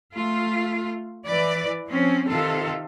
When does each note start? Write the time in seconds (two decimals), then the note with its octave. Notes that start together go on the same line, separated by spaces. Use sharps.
0.15 A3 F4
1.26 E3 B4 D5
1.88 F3 C4 C#4
2.28 C3 D#3 F4 A4